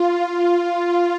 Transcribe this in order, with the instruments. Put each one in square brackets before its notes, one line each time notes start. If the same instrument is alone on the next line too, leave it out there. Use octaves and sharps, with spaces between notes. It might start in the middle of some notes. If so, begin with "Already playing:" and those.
Already playing: [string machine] F4